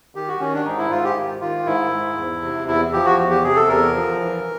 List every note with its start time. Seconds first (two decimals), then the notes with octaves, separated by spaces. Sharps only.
0.15 D#3 G4
0.28 F#4
0.40 D#3 C#4
0.54 D4
0.65 G#2 D#4
0.78 E4
0.91 G#2 F4
1.04 G4
1.16 D#3
1.41 D#3 F4
1.66 G#2 E4
1.92 G#2
2.17 E2
2.43 C3
2.68 E2 E4
2.93 F3 G4
3.05 F#4
3.18 E2
3.30 G4
3.43 C3 G#4
3.56 A4
3.68 E2 A#4
3.94 F3
4.19 E3